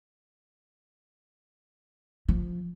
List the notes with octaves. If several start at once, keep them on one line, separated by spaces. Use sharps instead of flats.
F3